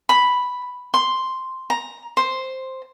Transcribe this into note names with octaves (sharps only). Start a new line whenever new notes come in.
B5
C6
A#5
C5